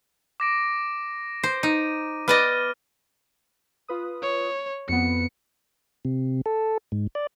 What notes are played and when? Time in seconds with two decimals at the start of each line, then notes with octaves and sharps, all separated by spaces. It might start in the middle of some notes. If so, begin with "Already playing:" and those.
0.40 D6 A#6 D7
1.43 C5
1.63 D#4 D#7
2.28 B3 D5 D#5 F6 D#7
3.88 F4 B4 D#6
4.22 C#5
4.89 F2 B3 C#7
6.05 C3
6.46 A4
6.92 G#2
7.15 D5